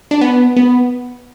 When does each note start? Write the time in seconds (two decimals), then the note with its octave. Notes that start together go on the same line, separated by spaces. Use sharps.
0.11 D4
0.21 B3
0.56 B3